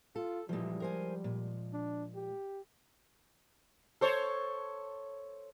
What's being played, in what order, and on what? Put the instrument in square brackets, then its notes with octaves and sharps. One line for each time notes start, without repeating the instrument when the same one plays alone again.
[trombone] F4 [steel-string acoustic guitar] A4
[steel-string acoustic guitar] A#2 E3 [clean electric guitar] F3 G#3 [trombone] G3
[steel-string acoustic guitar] A#4 C5 G#5
A#2
[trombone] D4
G4
[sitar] A4 C5 C#5